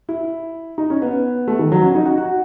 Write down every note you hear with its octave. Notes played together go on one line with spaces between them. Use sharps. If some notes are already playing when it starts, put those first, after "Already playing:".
E4
D#4
C#4
B3
A3
D#3
F#3
C#4
D#4
F#4
F#4